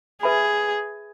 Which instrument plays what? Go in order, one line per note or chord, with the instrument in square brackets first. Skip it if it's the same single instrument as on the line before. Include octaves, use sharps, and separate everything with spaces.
[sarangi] G#4 [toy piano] B4 E5 G#5 B5